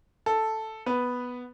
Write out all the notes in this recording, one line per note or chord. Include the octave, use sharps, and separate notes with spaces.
A4
B3 B4